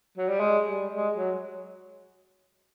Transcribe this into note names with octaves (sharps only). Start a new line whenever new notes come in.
F#3
G3
G#3
G3
G#3
F#3